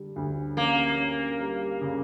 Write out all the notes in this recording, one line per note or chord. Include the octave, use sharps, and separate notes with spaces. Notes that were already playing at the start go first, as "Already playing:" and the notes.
Already playing: D3 G3
D2
A#3 C#4
C#4
G3
C#3